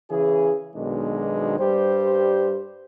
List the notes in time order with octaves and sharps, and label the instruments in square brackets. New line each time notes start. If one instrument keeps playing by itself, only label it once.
[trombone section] C#3 E3 G#4
B1 B2 D#3 G#3 D4
G2 G3 G4 C5